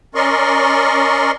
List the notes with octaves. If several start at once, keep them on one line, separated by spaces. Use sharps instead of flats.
C#4 A#4 D5 D#5 C6 C#6